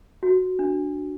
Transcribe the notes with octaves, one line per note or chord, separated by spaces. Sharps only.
F#4
D4